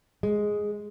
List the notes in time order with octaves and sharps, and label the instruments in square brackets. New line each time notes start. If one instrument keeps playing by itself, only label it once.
[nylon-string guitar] G#3